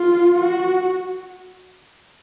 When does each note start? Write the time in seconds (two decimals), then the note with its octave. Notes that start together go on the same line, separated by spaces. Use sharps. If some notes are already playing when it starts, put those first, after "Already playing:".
Already playing: F4
0.38 F#4